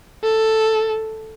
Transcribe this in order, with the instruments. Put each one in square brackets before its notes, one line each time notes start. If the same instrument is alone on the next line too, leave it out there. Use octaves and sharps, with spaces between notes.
[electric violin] A4